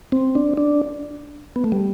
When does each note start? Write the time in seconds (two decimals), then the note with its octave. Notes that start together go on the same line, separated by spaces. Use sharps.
0.12 C4
0.35 D4
0.57 D4
1.56 B3
1.64 A3
1.72 G3